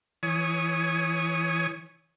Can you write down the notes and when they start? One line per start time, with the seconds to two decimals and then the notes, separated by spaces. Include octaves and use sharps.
0.23 E3 C#5 G#5 D#6